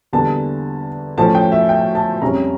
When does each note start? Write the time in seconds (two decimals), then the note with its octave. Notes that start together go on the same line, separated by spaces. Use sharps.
0.12 E2 D3 G3 A#3 A5
1.17 A2 F3 A3 C#4 A5
1.35 G5
1.52 E5
1.69 G5
1.95 A5
2.22 F2 C#3 G3 C#4 A#5